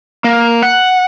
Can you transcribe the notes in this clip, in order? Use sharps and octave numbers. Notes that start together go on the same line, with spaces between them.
A#3
F#5